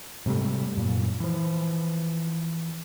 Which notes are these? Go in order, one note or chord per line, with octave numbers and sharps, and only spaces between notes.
G#2 C3 G3 A3
F#2 A#2
E3 F3